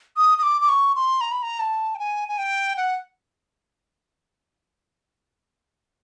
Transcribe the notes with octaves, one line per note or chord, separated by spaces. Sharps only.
D#6
D#6
D6
D6
C#6
C6
A#5
B5
A#5
A5
G5
G#5
G#5
G5
F#5